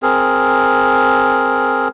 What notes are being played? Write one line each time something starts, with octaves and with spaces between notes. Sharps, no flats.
C4 G#4 A#4